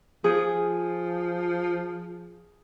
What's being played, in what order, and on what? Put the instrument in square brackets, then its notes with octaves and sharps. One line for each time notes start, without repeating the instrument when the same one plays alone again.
[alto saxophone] F3 [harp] G#4